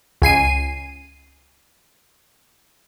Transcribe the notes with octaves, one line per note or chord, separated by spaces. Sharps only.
C#2 G#5 C7 D#7